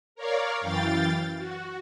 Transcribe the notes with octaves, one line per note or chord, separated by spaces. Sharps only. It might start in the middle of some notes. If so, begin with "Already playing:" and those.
A#4 C#5 D5 F5
F#2 E3 F5 G5 A6
F#4